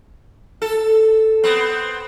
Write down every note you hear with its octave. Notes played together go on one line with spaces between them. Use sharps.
A4
B3 C4